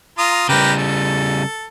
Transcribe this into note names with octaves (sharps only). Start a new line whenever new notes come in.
F4 A#5 D#6
C#3 G3 G4 A#4 B4
A4